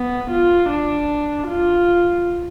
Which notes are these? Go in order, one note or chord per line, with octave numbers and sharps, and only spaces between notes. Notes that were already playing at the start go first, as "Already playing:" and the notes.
Already playing: B3
F4
D4
F4